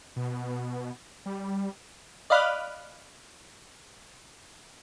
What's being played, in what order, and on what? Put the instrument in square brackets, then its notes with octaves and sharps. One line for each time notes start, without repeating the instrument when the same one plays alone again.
[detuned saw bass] B2
G3
[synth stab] D5 D#5 F5 B5 F6 F#6